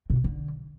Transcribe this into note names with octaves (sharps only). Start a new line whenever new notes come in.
B2
D3